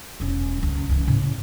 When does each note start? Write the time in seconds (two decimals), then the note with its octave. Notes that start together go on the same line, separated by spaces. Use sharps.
0.20 E1 C#4
0.59 C#2 F#2
0.89 C#2 E3
1.07 A2 C#3